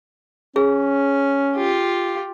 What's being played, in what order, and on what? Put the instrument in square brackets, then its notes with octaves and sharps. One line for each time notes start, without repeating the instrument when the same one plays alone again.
[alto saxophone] C#4 [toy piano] G#4
[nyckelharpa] F4 G4